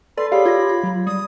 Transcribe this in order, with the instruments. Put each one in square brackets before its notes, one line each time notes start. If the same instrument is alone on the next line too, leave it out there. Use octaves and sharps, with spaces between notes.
[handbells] A4 [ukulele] B4 [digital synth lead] D5 [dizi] C6
[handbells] G4 G#4 C#5 [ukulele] F5 [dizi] B5
[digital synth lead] F4 [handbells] G#6 A#6
[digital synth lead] F4
F#3
[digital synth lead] G3 [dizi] D#6